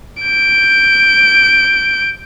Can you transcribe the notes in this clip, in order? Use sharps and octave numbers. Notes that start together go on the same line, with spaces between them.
G6 D7